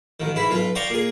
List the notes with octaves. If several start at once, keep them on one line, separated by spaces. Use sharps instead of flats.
A1 D#3
G#2 E4 B4 B5
B1 F4 B4
C5 D5 F5 G5 A#5 C#6
A#2 G#4